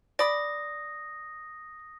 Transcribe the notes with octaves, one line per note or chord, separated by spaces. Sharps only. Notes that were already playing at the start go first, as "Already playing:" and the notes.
D5 B5 D#6 A#6